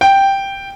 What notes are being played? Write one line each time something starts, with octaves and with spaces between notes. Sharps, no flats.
G5